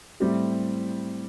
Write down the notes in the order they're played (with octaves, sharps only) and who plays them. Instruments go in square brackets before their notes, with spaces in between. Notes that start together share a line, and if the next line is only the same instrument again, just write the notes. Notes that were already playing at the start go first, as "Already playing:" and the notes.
[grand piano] A2 G3 C4 G4